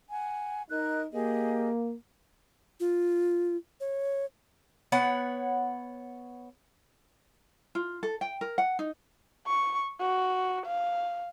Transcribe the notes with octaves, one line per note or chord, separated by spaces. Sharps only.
F#5 G#5
D#4 A#4 F#6
A#3 G4 G#4 D#5
F4
C#5
B3 C#5 F#5
F4
A4
G5
A#4
F#5
D#4
C#6
F#4
F5